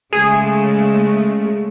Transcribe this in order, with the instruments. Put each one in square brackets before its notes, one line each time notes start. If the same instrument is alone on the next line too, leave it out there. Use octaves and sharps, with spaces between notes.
[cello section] C#3 G#3 A3 [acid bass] G#4